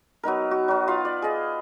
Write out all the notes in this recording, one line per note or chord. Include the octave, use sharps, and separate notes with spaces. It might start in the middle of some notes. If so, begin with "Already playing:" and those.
F#3 B3 D#4 A#4
F#4
F#3 B3
B3 F4 F5
D5
G#4 D#5